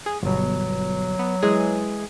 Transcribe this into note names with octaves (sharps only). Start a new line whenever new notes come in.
G#4
G1 B2 F#3
B3
E3 G#3 G#4